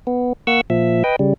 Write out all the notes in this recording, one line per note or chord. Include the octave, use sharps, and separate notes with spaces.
B3
A#3 F#5 C#6 E6
A#2 F3 E5
B4 D#5 G5
C#3 G3